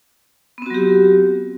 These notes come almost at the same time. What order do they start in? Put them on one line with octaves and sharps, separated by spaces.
B3 C4 F#4 F#3 G4